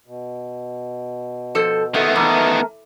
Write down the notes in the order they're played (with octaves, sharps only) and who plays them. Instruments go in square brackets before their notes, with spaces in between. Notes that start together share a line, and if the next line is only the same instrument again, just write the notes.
[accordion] B2
[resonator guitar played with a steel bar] F3 A4 C5
[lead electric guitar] D#3 B3 [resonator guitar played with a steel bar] A3
[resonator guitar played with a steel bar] E3 [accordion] A3 A#4